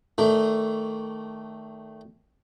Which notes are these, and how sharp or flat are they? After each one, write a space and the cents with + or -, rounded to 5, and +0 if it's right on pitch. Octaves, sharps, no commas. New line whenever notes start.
D#3 +0 A3 +0 D4 -30